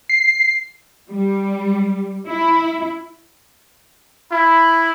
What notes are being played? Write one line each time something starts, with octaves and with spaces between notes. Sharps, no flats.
C7
G3
E4
E4 B5